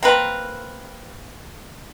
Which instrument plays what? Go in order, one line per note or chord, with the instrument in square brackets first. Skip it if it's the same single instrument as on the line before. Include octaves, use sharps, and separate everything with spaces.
[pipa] A#3 C4 A#4 B4